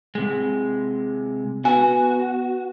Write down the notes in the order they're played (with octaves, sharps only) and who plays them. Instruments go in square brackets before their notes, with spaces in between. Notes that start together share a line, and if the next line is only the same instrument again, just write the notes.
[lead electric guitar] C3 G#3
[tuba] B3 [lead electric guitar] F#4 [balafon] G#5